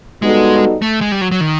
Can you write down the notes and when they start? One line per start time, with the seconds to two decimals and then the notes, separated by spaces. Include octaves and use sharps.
0.22 G3 G#3 B3 D#4 F#4 A4
0.82 A3
1.01 G#3
1.12 G3
1.21 F#3
1.31 F#3
1.41 D#3